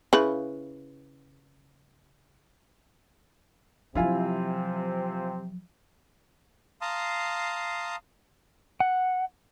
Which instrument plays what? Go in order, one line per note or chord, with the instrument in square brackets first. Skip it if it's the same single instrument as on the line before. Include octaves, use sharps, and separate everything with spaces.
[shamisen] C#3 E4 B4
[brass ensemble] C3 C4 [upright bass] F3 F#3 [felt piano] E4 F4 G#5
[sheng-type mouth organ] F5 A5 A#5 C6 D#6
[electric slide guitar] F#5